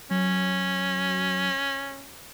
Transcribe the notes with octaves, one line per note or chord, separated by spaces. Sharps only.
F#3 C#4